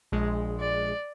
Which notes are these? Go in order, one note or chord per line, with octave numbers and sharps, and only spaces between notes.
A#1 G#3
D5